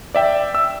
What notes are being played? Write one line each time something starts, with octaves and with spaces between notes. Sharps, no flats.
D5 E5 G5
E6